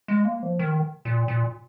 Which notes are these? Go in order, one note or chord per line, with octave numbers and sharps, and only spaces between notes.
G#3
A#3
F3
D#3
A#2
A#2